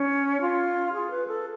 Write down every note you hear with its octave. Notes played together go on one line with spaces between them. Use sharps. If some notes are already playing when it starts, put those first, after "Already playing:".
Already playing: C#4
F4
G#4
B4
A4